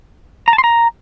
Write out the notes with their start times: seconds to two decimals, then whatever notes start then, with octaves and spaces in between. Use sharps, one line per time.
0.48 A#5
0.53 A5
0.58 C6
0.64 A#5